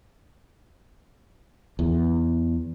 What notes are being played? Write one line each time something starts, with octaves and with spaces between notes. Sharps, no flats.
E2